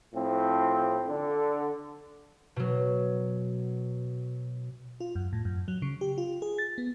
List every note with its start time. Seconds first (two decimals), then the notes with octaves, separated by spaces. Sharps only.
0.14 A2 F3 C4
1.08 D3
2.56 B2 F#3
5.00 F4
5.15 F#2
5.33 A2
5.45 F#2
5.68 F#3
5.82 C#3
6.01 G4
6.18 F4
6.42 G#4
6.58 A6
6.78 B3